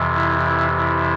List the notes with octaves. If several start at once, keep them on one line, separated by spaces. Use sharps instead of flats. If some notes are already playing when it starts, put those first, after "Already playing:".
Already playing: F2 C3 E3
E4
E4
E4